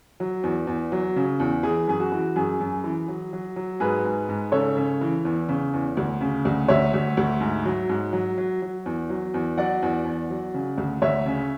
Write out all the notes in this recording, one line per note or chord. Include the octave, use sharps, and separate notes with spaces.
F#3
E2
E2
F#3
C#3
E2
E3 G#4
F#2 G#4
F#4
E3
F#2 G#4
F#2
E3
F#3
F#3
F#3
G#2 G#4 B4
G#2
G#2
C#3 A4 C#5
C#3
E3
E2
C#3
E2
D2
C#3
D2
D2 C#5 E5
D2
D2
G#2
F#3
G#2
F#3
F#3
F#3
E2
F#3
E2
F#3 D5 F#5
E2
E2
F#3
C#3
D2
D2 C#5 E5
C#3